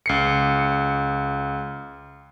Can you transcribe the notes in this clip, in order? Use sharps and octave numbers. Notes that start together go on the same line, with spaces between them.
C#2 C7 C#7